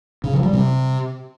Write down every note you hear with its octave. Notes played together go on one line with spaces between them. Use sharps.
C#3
F3
G3
C3